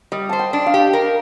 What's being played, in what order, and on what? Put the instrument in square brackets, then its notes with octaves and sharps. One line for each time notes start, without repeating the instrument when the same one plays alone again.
[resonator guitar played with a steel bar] G3 [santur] D#5
[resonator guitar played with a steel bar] C5 [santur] A5
[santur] G5
[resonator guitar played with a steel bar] D4
[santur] F5
[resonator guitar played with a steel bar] G4
A#4